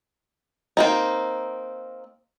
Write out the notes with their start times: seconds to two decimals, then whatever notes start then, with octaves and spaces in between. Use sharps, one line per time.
0.77 A#3 C4 D#4